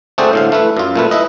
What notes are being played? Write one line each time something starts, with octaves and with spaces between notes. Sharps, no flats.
A3 C4 F#4 G#4 C5 D5
A2 D3 F5
A3 E4 B4
F#2 F4
A#2 A3 B4
E4 B4 D#5